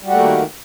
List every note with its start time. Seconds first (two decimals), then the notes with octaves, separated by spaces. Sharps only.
0.02 G3
0.06 F#4
0.10 A3
0.14 A#3
0.18 D#3